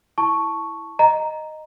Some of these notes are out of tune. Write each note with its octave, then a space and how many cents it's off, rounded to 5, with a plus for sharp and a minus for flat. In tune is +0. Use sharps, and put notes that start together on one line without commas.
E4 +0 A5 +0 C#6 +0
D#5 -5 A#5 +0